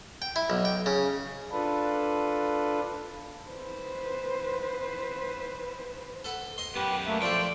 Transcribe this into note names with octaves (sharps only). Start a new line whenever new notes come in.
G5
E4
B1
G5
C#3
D4 F4 A4 B4
B4 C5
A4 B4 F#5
D#5 C6
F#2 B3 G4 B4
A3 A#3 E5
F3 A3 A4 C5 D5 G5